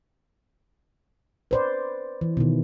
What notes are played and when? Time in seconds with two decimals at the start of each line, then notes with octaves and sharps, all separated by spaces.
1.51 B4 C5 D5
2.21 E3
2.37 B2 D#3